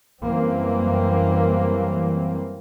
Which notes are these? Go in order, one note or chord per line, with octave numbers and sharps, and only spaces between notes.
F#2 E3 G3 A#3 C4